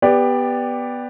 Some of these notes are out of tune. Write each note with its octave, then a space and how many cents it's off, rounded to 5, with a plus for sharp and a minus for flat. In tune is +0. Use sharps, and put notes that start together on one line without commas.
B3 +0 G4 +15 D5 +0